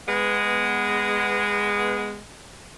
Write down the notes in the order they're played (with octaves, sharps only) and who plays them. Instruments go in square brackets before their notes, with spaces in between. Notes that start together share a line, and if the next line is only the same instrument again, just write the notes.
[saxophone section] G#3 B3